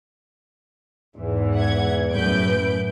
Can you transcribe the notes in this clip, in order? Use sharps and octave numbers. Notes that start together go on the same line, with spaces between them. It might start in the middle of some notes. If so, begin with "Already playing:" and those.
E2 G#2 E3
F#5 G#6
F#2 A2 B4 G6 D7